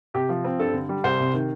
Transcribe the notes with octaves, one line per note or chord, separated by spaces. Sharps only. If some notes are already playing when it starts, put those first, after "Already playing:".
C3 G4
F3
C4
G2 A4
D3
G3
C2 C5
C3
D#3